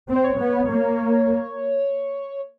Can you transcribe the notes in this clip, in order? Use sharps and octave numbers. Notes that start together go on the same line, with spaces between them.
C4
C5
C#5
B3
A#3